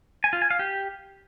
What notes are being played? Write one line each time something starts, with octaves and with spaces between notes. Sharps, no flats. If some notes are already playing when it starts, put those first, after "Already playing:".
G#5
F4
G#5
F5
G4